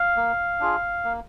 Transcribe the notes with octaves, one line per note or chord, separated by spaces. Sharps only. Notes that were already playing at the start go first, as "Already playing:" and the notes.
Already playing: F5
A#3
D4 F4 G#4
A#3